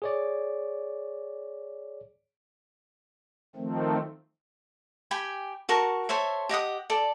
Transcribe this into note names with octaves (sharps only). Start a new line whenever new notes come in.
G#4 C#5 D5
D#3 F3 A3 C4
G4 G5 G#5 B5
F#4 A#4 A5 C#6
A4 C5 C#5 E5
G4 D#5 F#5 D#6
A4 D5